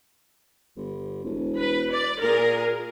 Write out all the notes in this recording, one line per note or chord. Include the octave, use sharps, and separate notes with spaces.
G1
E1
B4
D5
A#2 G#4 A#4